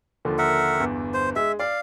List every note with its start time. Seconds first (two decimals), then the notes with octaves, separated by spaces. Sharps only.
0.25 D#2 D3 F3
0.38 A#4 E5 F#5
0.80 G1 E2
1.14 C5
1.36 G#3 E5
1.59 D5 F5